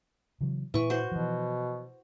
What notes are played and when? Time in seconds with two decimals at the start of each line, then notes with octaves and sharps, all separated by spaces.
0.41 C#3 E3 F#3
0.74 A#2 E3 C#6
0.90 F#4 C5
1.12 B2 E3 F3